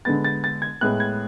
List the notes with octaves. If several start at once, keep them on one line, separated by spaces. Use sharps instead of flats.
D3 G#3 B3 A6
A6
A6
G#6
A2 G#3 B3 F#6
G#6